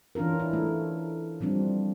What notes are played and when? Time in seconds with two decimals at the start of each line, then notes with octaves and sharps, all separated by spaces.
0.15 E3 C#4 D4 F4 A#4
0.40 E4
0.53 A3
1.41 F3 G3 C4 D4